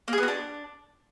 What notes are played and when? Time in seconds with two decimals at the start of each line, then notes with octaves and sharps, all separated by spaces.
0.08 A#3
0.13 G#4
0.18 B3
0.23 F#4
0.28 D4